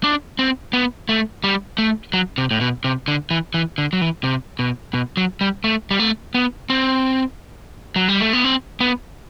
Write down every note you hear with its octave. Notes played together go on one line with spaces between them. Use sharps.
D4
C4
B3
A3
G3
A3
F#3
C3
A2
B2
C3
D3
E3
E3
D3
F#3
E3
C3
B2
B2
F#3
G3
A3
G3
A3
B3
C4
F#3
G3
A3
B3
C4
B3